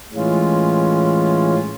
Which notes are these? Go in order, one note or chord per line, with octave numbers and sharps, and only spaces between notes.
A2 E3 G#3 C#4 F4